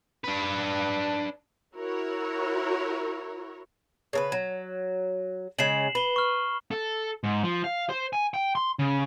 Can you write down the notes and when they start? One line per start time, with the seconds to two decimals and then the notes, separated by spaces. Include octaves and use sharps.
0.24 D4 B4
1.76 E4 F#4 A#4 C#5
4.13 C#3 A#4 B4
4.32 F#3
5.59 C#3 G#3 C7 E7 F#7
5.95 B4 B5 G7
6.16 C#6 F6
6.71 A4
7.24 G#2
7.43 F3
7.64 F5
7.89 C5
8.13 G#5
8.34 G5
8.55 C6
8.79 C#3